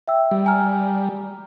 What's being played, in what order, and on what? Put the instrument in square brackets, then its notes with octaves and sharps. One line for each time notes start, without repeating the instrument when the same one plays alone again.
[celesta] E5 G5 E6
[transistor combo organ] G3
[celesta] G#5 A#5 F6